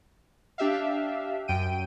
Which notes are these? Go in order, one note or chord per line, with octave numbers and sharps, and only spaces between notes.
D4 G4 E5 F5
F#2 G5 D7 D#7